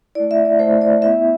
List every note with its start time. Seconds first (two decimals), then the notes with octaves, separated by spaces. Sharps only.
0.15 A3 E4 D5
0.31 E5
0.45 D5
0.59 A3 E4 C5
0.82 D5
1.02 B3 E4 E5